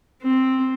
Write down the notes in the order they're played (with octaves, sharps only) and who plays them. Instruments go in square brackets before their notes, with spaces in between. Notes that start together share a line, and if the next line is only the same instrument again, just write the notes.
[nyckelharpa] C4